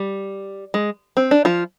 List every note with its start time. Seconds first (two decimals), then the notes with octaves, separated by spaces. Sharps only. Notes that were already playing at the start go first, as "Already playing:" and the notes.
Already playing: G3
0.74 G#3
1.17 C4
1.31 D4
1.45 F3 F4